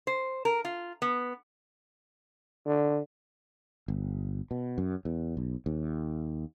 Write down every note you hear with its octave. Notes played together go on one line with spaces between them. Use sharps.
C5
A#4
F4
B3
D3
G1
B2
F#2
E2
B1
D#2